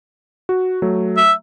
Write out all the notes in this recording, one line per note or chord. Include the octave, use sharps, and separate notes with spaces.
F#4
F#3 A3
E5